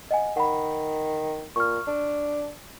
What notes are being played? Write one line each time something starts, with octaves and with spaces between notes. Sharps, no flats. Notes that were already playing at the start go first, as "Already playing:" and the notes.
D#5 F#5 G#5
D#3 F#5 B5
A#2 C#6 F6
D4